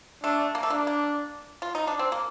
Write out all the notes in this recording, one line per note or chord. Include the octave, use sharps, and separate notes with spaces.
A3 D4
A#3
A3
A#3 D4
A#3
F4
D#4
D4
C4
A#3